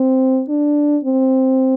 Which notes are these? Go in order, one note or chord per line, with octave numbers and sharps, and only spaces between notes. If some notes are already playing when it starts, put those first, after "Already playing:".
Already playing: C4
D4
C4